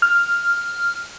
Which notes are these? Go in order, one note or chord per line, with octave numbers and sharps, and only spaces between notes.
F6